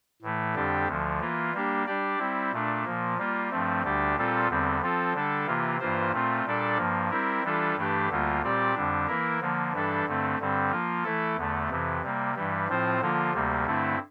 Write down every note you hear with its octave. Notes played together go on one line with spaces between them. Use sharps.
A2 E3 A3
F2 D3 G3 D4 G4
D2 D3 F3
E3 A#3 F4
G3 A#3 D4 G4
G3 D4 G4 D5
G3 C4 E4
A#2 A3 D4
A#2 F3 A#3
G3 A#3 F4
G2 F3 A3 C4
D2 D3 G3 D4 G4
A#2 G3 C4 F4 A4
E2 D3 G3 C4
F3 C4 F4 A4
D3 G3 D4 A4
C3 E3 A#3 F4
G2 E3 A#3 F4 C5
A#2 A3 C4 F4
A#2 G3 D4 A4 D5
G2 F3 A#3
G3 C4 E4 A#4
E3 G3 D4 F4 A4
G2 E3 A3 D4 G4
D2 D3 G3 A#3 F4
A#2 G3 C4 G4 D5
F2 D3 G3 D4
E3 A#3 E4 A#4
D3 F3 A#3
G2 E3 G3 D4 A4
G2 D3 A3 C4
G2 D3 G3 C4
F3 A#3 F4
E3 A3 E4 A4
E2 D3 A3
F2 C3 E3
C3 G3 A#3
G2 E3 G3
A2 F3 C4 F4 C5
D3 F3 A#3 F4
D2 C3 G3 A#3
G2 D3 A3 C4 E4